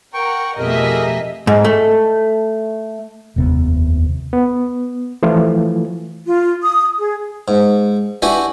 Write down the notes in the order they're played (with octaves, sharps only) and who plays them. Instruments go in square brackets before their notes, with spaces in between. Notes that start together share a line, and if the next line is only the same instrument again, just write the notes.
[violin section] A#4 F#5 [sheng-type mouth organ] G5 C#6
[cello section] F2 G4 G#4 [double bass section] B2 A3 [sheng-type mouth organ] A#4 [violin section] D#5 E5
[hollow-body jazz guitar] G#2
A3
[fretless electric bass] F1 D#2 C3 B3
[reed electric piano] B3
E3 F3 A3 F4
[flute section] F4
D#6
G#4
[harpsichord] G#2
D4 E4 F#4 G4 B4 G#5